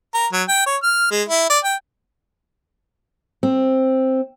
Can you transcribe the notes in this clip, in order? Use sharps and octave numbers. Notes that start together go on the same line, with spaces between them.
A#4
F#3
G5
C#5
F6
G#3
E4
D5
G5
C4